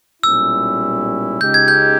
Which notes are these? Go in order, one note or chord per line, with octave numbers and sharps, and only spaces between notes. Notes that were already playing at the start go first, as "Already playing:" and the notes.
B1 A#2 G3 C#4 E4 E6
C#2 C#3 G#3 D#4 G4 G6
G#6
G6